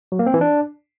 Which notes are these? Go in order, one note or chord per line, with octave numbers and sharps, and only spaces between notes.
F#3
A#3
C4
E3
D4